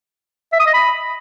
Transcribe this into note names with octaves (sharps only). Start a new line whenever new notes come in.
E5
D#6
D#5
B5